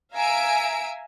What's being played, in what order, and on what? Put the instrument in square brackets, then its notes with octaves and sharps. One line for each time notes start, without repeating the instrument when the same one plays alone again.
[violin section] E5 F5 G#5 A#5 E6 D7